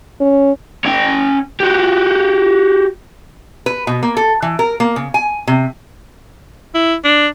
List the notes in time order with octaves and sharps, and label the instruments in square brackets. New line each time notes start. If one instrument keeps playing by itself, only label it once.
[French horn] C#4
[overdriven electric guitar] C#4 G5
F#4 G4
[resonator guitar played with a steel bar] B4
B2
A#3
A4
E3
A#4
A#3
C#3
G#5
C3
[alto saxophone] E4
D4